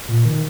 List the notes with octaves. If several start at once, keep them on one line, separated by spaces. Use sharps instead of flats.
A#2
D#3